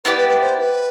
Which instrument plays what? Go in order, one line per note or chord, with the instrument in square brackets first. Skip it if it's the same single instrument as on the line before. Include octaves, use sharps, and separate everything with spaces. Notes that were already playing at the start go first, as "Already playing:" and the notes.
[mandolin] B3 E4 G4 D5 [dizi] B4
[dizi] B4
B4
C5
B4